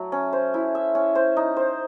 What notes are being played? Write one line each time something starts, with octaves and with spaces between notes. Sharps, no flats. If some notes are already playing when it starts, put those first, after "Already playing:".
Already playing: F#3 A3
C#4
C5
E4
E5
C#4
C5
D#4
C5